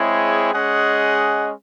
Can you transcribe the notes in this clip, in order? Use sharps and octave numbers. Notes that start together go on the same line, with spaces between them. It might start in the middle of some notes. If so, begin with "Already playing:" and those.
Already playing: G#3 C4 E4 G#4 C#5
G#3 C#4 G#4 D#5 F#5